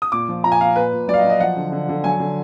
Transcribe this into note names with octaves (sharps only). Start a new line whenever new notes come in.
D#6
A#2 D6
F3
A#2 A#5
G#5
A#2 F5
A#2 B4
A#2
F#3 D5
F5
D#5
F#3
D#5
F3 F#5
D3
D3
D3
F#3 G#5
D3